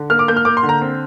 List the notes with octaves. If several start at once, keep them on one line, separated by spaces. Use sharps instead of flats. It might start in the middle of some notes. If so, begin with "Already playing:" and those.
Already playing: D3
A#3 F6
D6
A#3 G6
F6
A#3 D6
C6
D3
A#5
C4